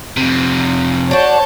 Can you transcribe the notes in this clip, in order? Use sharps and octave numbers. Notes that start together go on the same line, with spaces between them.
F2 C3
D4 F#4 C#5 A5 G6